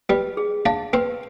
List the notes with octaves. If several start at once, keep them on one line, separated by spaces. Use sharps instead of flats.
G3 G4 B4
G#4
D4 D5 F5
C4 B4 C5